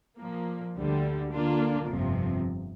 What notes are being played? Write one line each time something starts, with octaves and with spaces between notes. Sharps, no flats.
A#2 F3 A#3
D2 D3 G3
D3 A#3 D4 F4
G1 F2 C3 F3